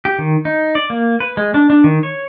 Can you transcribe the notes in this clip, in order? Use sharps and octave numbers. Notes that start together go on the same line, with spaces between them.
G4
D#3
D#4
D5
A#3
B4
G#3
D4
D4
D#3
C#5